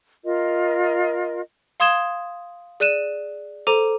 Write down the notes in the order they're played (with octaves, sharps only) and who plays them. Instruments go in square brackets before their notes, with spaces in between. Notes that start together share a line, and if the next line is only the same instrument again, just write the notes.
[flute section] F4 A#4 D#5
[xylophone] F5 C6 D#6 G#6 E7 G7
G#4 D5 F#6 D#7 E7
A4 C5 A#5 D6 D#7 F7